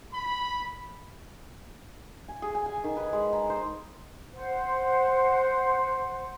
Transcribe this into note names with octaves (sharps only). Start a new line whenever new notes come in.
B5
G#5
G#4
G#5
G#5
D#3
B4
G#3
A#5
C5
C5 F#5